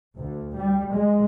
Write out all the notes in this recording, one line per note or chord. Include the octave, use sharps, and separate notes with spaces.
D2
G3
G#3